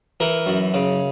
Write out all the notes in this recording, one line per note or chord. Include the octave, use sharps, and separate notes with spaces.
E3 A#4
F#2
C#3